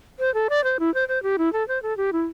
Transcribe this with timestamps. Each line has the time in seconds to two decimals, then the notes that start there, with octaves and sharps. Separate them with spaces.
0.19 C5
0.34 A4
0.50 D5
0.64 C5
0.80 E4
0.94 C5
1.08 C5
1.23 G4
1.38 E4
1.53 A4
1.68 C5
1.83 A4
1.97 G4
2.13 E4